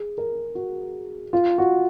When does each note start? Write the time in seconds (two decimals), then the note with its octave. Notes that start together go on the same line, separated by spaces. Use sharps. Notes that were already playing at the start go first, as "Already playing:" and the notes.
Already playing: G#4
0.18 A#4
0.55 F#4
1.33 F4
1.58 F#4